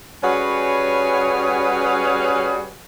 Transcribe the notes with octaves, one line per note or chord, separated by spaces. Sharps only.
G3 C#4 F#4 G#4 B4 C#5